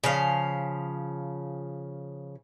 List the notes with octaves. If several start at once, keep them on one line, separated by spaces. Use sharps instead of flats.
C#3 F3 F5